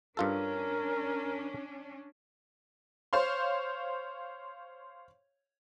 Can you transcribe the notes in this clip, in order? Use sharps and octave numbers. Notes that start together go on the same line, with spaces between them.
G2 C#4 D4 F4 A4 A#4
C5 C#5 F5 C6